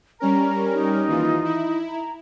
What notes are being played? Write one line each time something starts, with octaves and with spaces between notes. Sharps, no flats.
G3 C#4 A#4 A#5
D#4
D#2 E3 F4
E4
A#5